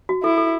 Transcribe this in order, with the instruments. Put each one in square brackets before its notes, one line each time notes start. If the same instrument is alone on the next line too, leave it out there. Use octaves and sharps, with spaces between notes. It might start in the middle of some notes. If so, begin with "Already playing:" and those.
[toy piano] F#4
[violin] E4 [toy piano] A4
[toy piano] A4